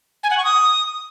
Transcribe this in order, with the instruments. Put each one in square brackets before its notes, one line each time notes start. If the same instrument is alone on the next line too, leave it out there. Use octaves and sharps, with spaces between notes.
[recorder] G#5
F#5
C#6
D#6